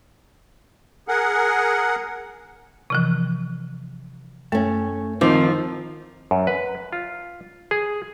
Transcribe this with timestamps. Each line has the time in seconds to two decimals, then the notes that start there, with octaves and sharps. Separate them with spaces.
1.08 G#4 A#4 F#5
2.90 C3 E3 F3
4.52 F#2 A3 C#4
5.21 D#3 F3 C4 D#4 D6
6.31 F#2
6.47 B4
6.93 F4
7.71 G#4